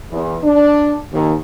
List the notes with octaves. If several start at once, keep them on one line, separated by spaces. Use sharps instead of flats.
E2
D4
D#2